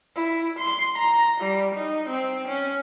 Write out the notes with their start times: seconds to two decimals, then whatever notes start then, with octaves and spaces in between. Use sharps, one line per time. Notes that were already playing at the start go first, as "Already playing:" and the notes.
0.16 E4
0.60 C6
0.98 A#5
1.41 G3
1.75 D#4
2.10 C4
2.48 C#4